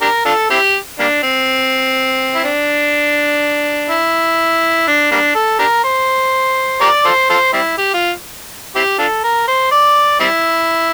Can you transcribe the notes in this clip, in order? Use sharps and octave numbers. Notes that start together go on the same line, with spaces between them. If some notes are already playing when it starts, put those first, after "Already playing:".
D4 G4 A#4
D4 F4 A4
C4 E4 G4
G3 A#3 D4
C4
E4
D4
E4
D4
G3 A#3 D4
A4
D4 G4 A#4
C5
G4 A#4 D5
F4 A4 C5
F4 A4 C5
G3 C4 E4
G4
F4
C4 E4 G4
D4 F4 A4
A#4
C5
D5
G3 C4 E4